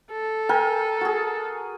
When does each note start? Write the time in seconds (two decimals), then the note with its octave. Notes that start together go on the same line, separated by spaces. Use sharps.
0.12 A4
0.49 A#4 G5 G#5
1.01 F#4 G#4